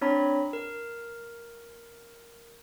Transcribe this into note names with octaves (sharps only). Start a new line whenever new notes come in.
C4 D4 C#5 A#5 B5
A#4